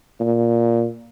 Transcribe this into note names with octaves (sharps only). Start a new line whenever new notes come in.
A#2